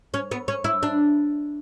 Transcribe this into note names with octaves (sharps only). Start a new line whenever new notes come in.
C#4
B3
C#4
E4
D4